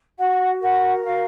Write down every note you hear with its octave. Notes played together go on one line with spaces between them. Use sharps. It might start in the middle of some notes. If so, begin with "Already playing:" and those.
F#4 F#5
A#4 F#5
F#4 F5